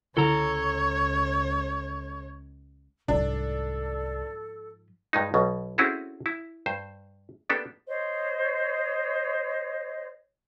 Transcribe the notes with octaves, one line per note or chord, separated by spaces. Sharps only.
C#2 D3 E4 A4 C#5 A#5
C2 G#2 F3 D4 A4
G2 G#3 D#4
B1 B2
C4 C#4 E4 F#4 G#4 A4
E4
G2 C5
A#3 B3 D4 G4 A4
C5 C#5 D#5